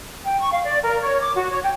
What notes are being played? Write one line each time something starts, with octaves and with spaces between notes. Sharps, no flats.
G5
C#6
F5
D5
A#4
C#5
D6
F#4
C#5
G5